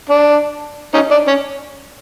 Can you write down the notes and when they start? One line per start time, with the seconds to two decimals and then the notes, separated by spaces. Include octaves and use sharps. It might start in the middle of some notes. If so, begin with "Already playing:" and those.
0.10 D4
0.94 C#4 D#4
1.11 D4
1.28 C#4